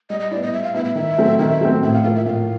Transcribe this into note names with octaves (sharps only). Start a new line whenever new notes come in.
G3 D#5
D#5
B3 E4 D5
D#5
G3 E5
F5
B3 E4 E5
E5
D#3 E5
F#3 A3 C4
D#3 E5
F#3 A3 C4
A2 E5
F5
F3 A#3 F5
E5
A2 F5